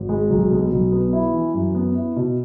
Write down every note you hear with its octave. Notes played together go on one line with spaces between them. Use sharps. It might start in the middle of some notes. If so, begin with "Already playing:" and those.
Already playing: G#1
G#3
B1
B2
B1
B3
E4
E3
F#2
B3
E4
B2